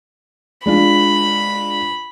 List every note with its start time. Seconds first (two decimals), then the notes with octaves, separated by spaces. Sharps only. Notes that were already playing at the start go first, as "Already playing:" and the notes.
0.66 G#3 D4 F4 B5